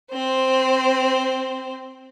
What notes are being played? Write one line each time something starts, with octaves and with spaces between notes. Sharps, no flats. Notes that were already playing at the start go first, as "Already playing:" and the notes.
C4 C5